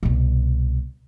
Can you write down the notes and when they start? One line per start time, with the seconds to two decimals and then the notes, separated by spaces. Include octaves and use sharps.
0.03 C2 B2